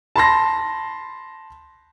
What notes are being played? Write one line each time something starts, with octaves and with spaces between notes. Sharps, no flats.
A5 B5 C6 A#6